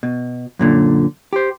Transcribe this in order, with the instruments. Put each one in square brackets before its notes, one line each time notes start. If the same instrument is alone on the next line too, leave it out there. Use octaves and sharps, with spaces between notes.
[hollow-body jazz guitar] B2
F#2 A#2 D3
G4 C5